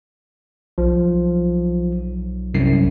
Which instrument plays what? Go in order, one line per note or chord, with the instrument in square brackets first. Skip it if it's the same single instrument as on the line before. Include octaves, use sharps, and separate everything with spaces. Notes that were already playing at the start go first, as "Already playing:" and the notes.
[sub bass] B1 [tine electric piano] F3
[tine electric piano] C2 F#2 C7